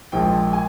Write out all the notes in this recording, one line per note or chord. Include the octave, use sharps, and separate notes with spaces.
A#1 A#2 F3 G#3 G5
G#5